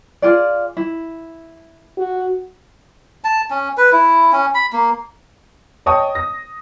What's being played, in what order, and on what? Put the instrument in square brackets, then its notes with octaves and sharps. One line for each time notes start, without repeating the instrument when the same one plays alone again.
[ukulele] F4 G#4 D5
E4
[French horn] F#4
[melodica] A5
C#4
B4
E4
C#4
B5
A#3
[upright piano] C#5 D#5 G5 A5 C#6 D#6
A#6